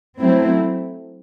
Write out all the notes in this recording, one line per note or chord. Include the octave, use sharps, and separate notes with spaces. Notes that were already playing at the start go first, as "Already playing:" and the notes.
F#3 A3 C4 E4